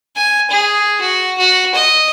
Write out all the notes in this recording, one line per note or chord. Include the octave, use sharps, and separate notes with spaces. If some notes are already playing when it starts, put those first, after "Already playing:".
G#5
G#4
F#4
F#4
D#5